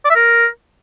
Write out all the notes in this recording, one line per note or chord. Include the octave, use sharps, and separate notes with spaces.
D5
E5
A#4